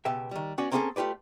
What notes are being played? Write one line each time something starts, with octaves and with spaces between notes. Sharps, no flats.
C#2 B2 G4 B4 E5 G5
D#3 G3
B3 C#4 F#4 D5
A#3 C4 C#4 F4 G#4 A4
A3 F4 G4 B4 D5